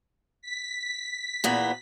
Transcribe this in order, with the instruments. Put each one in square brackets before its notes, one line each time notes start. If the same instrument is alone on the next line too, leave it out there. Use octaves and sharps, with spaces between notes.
[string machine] B6
[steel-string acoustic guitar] E2 A#2 B3